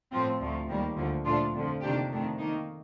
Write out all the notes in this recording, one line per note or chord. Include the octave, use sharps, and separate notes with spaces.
A2 F3 C4 F4
D2 C3 F3 A3
D#2 D#3 G3 A#3
D2 D3 F3 A#3
A#2 F3 A3 D4 F4
F2 D3 F3
C3 D#3 A#3 D4 G4
F2 D#3 A3 D4
D#3 A#3 D#4